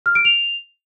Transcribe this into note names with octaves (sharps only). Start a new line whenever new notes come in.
F6
D7
F7